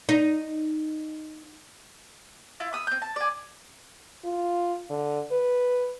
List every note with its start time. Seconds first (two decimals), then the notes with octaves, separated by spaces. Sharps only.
0.09 D#4
2.60 E4 F4
2.73 B5 D#6 E6
2.87 C4 G6
3.02 A5
3.16 D5 G#5
4.25 F4
4.90 D3
5.31 B4